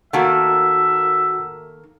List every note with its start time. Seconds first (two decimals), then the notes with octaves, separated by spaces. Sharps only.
0.13 D#3 A3 A#3 F#4 E5 F#5